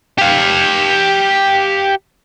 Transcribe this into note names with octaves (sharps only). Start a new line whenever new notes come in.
G4 F5